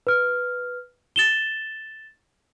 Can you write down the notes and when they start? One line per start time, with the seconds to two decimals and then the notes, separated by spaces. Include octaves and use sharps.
0.07 B4 F6
1.16 A6 E7 G7